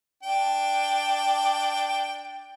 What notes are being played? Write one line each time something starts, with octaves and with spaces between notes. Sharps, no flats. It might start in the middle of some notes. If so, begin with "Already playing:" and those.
D4 G5